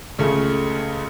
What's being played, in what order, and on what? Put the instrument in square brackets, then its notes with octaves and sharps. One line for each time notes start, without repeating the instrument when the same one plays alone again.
[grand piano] C#2 C#3 A3